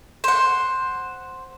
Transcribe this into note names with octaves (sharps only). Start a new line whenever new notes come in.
C5 F#5